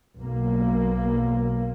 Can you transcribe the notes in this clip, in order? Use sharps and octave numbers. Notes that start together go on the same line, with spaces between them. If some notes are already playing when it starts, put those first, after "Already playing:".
B1 A#3